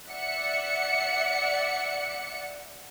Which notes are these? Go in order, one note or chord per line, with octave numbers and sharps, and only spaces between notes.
D5 E5 F#5 C#7